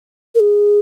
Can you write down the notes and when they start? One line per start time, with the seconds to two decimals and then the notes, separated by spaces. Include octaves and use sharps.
0.35 A#4
0.40 G#4